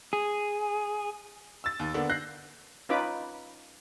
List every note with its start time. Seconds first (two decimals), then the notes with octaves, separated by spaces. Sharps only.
0.13 G#4
1.64 E6 A6
1.79 D#2
1.94 D3 A#3 B3 D4
2.10 F#6 G6 A#6 C7
2.89 C#4 D#4 F4 B4 B5 D6